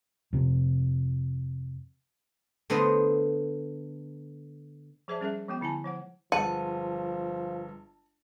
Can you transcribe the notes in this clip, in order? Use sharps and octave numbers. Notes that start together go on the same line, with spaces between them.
F2 C3
D3 A3 B3 C5 D#5
F3 G#4 C5 D5 E5 A5
G3 C#4 G#4 A#4 E5
F3 G#3 B3 F#4 G5
D3 E4 G#5 A5
F3 C5 F#5
G1 F3 G#3 F#5 A5 A6 D#7